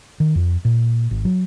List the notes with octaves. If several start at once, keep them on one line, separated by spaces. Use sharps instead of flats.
D#3
F2
A#2
G#1
F#3